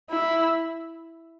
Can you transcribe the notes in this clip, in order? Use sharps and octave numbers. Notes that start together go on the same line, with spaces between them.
E4